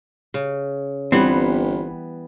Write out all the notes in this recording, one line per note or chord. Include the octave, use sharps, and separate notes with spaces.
C#3
G1 E3 G3 B3 C4